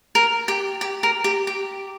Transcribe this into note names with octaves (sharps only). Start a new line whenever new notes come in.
A#4
G4
G4
A#4
G4
G4